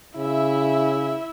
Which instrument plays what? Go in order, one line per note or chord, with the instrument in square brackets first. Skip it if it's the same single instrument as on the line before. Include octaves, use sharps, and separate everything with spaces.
[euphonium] C#3 [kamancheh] E4 E5